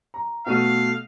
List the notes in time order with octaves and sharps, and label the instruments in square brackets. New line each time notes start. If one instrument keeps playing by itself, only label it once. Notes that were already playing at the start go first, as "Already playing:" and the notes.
[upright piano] A#5
[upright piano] B2 A3 D#7 [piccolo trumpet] F5